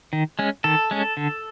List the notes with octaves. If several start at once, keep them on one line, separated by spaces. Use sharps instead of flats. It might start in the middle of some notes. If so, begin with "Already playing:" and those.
D#3
G#3 C#4
D#3 A4
G#3 C#4
D3